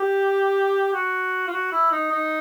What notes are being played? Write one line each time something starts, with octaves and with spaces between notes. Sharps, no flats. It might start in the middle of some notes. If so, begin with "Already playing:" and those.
Already playing: G4
F#4
F4
F#4
E4
D#4
D#4